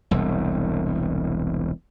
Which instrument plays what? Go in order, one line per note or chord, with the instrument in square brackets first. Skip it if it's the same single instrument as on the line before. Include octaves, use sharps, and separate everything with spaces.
[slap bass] E1 C2